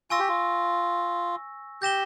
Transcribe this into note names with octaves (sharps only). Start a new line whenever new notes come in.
F4 G#5 C#6 E6 A#6
G4
F4
G4 G6 A#6 E7 G7